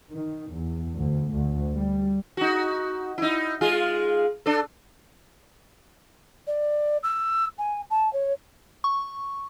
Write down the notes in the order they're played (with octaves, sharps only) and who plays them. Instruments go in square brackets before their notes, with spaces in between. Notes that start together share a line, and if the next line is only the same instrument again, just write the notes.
[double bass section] D#3
E2
D2
D2
G3
[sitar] D#4 F#4
D#4 E4
G#3 F4 G#4
D4 A4
[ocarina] D5
E6
G#5
A5
C#5
[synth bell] C#6